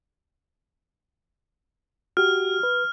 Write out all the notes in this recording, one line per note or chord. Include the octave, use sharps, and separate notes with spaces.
F#4 G4 F6
B4